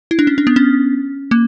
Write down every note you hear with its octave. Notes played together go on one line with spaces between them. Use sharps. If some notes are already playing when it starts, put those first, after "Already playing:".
E4
D4
C#4
D4
B3
C#4
A#3